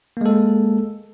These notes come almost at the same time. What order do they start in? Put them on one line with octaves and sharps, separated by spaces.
A#3 G#3 A4